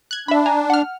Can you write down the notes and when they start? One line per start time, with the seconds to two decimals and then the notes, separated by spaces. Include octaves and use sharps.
0.11 F#6 G#6
0.28 D4 E5 B5
0.46 G#5 A#5
0.70 F#5 F6